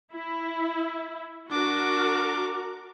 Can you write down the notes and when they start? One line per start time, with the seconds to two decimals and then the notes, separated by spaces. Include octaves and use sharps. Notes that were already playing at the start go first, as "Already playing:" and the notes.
0.13 E4
1.50 D4 F#4 A#4 D6